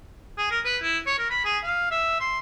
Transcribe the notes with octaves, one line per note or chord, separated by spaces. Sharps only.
G#4
A#4
B4
E4
C#5
A#4
B5
G#4
F5
E5
C6